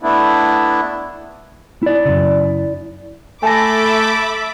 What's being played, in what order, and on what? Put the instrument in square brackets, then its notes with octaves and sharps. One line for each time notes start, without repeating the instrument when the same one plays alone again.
[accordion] A3 B3 D4 E4
[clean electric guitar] E4 D5
[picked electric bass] F#2 C#3
[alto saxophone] A3 [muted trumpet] A4 [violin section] E5 B5 D6 [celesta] G#5 A5 A#6